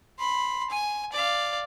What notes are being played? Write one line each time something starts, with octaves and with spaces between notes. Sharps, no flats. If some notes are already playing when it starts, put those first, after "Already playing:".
B5 C6
G#5
D5 F5